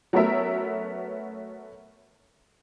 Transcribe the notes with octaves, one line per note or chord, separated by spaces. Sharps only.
F#3 A3 B3 C#4 A#4 E5